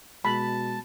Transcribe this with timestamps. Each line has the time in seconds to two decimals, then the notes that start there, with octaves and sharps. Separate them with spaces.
0.25 B2 G#3 A5 B5